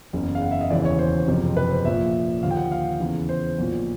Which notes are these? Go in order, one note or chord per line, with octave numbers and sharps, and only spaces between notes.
F#1 E2 C#3
F5
F#5
E5
D#5
E1 D#2 C#3 E3 D5
C#5
C5
F#1 F2 C3
B4
C5
A#1 A#2 F3 E5
D#2 D3 F3 F5
G5
F#5
F5
E2 C#3 E3
C5
B1 A#2 F3